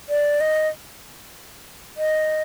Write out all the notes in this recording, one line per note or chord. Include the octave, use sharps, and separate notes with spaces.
D5
D#5
D#5